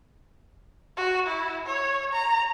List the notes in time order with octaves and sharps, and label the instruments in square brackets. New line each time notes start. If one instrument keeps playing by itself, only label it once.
[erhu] F#4
E4
C#5
A#5